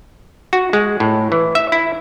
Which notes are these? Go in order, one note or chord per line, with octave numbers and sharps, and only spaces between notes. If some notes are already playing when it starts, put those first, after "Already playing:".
F#4
G#3
A2
E3
E5
E4